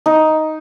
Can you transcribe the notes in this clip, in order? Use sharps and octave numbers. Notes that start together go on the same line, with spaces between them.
D#4